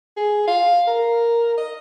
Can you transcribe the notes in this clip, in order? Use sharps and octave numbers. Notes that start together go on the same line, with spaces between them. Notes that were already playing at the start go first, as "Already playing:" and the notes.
G#4
F5
A#4
D#5